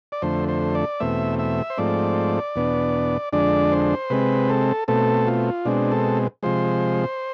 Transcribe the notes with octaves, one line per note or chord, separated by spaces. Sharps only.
D5
F2 D3 A3 C5
C5
D5
E2 B2 A3 C4 E5
E5
C5
G#2 F3 A3 C4 D5
E2 B2 B3 D4
F2 D3 G#3 D4 D5
C5
C3 G#3 C4 B4
A4
B2 A3 C4 A4
F4
B2 G#3 C4 D4
A4
C3 F3 G#3 C5